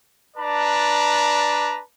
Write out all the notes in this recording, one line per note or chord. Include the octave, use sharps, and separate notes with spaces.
D4 B4 D5 A5 A#5